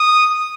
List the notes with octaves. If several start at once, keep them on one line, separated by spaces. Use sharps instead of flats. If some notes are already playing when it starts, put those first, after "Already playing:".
Already playing: D#6